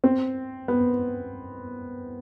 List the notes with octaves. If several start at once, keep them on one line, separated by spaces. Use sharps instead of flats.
C4
B3